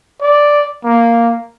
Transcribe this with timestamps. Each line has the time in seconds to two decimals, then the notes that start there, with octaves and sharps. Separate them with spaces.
0.21 D5
0.84 A#3